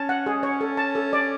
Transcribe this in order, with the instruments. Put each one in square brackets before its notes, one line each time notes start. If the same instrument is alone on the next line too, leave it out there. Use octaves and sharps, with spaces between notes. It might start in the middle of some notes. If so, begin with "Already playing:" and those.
Already playing: [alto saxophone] C#4 [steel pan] A5
[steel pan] F#5
G#4
C#5
A4
A5
A4
D5